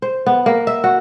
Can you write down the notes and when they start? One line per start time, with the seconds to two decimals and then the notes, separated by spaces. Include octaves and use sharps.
0.02 C5
0.26 B3
0.46 A#3
0.67 E5
0.84 F#4